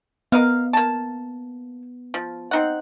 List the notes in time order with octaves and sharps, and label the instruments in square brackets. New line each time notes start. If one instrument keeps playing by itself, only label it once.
[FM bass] B3 [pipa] A#4 D#5 F5
[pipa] A#3 A5
F3
C4 D#4 F#5